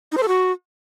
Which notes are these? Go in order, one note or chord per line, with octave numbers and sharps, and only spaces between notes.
D#4
C5
A4
F#4